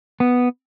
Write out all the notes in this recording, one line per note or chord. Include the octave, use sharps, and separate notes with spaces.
B3